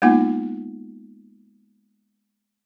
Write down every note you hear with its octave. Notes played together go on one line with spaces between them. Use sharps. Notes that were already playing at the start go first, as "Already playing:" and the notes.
G#3 A#3 B3 D#4 F4 F#5